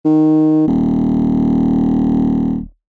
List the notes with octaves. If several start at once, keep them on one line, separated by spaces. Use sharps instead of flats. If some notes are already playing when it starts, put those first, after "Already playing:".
D#3
D#1